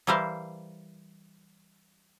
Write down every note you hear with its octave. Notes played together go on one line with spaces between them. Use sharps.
E3 G3 E4 A#4 C5 F5